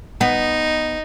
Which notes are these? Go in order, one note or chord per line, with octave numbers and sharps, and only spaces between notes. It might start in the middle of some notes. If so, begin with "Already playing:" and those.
B3 D#4